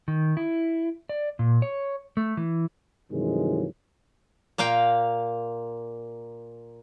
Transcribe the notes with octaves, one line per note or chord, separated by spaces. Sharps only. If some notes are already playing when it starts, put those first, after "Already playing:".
D#3
E4
D5
A#2
C#5
A3
E3
G2 C3 D#3 E3 F#3 G#3
A#2 A#3 F5 G5